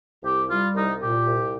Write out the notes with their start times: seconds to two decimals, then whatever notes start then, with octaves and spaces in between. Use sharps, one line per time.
0.23 C2 G4
0.49 G3 F4
0.74 C2 D#4
1.00 A#2 G4
1.26 C2